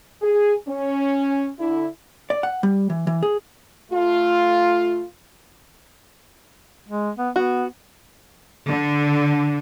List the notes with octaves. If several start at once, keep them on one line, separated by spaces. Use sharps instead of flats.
G#4
C#4
D3 E4
D5
F#5
G3
E3
E3
G#4
A3 F4
G#3
B3
B3 F#4
D3